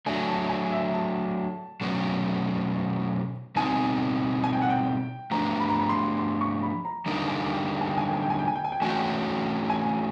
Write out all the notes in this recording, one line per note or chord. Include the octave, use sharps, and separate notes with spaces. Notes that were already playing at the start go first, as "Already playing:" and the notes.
F#3 A3 D4 G#5
A5
G#5
E5
A5
B2 F#3 A3 C#4
B2 G3 C4 D#4 G#5
G#5
G5
F#5
G5
F3 A3 D4 G4 B4 A#5
B5
A#5
B5
C6
C6
C#6
B5
A#5
D3 G3 A#3 D#4 G4
G#5
G5
G5
G#5
G5
G#5
G5
G#5
G5
G#5
G5
G#5
G5
G#5
G5
E3 A3 C#4 F#4 G#5
G5
G#5